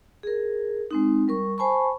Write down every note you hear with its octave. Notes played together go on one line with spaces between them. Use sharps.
G#4 A#4
G#3 C4 D#4
G3 A#4 C#6
C5 G#5 A5 B5 C#6